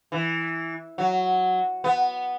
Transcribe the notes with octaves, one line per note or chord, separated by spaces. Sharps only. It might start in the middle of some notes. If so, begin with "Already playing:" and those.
E3
F#3
B3